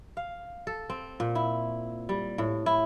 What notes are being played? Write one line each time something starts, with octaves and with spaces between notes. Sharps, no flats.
F5
A4
C4
A#2
E4
G3
A2
E4